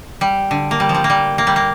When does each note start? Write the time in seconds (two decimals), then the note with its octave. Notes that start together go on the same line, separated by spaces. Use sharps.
0.21 G3
0.51 D3
0.71 A#3
0.80 G3
0.89 F3
0.94 G3
1.04 A#3
1.10 G3
1.38 A#3
1.47 G3
1.56 A#3